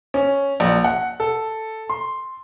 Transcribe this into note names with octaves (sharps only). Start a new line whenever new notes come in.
C#4
A#1
F#5
A4
C6